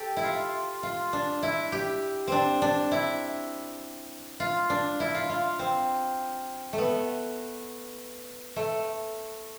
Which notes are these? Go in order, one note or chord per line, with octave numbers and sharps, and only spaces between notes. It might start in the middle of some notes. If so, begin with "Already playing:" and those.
Already playing: G4 A4
E4
F4
F4
D4
E4
G4
C4 D4
D4
E4
F4
D4
E4
F4
F4
C4
A3
B3
A3